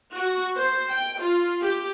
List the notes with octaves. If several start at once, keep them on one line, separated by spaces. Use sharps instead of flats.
F#4
C5
G5
F4
G4